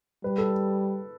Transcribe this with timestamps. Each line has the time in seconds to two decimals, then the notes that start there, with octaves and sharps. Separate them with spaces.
0.24 G3 B4
0.38 A4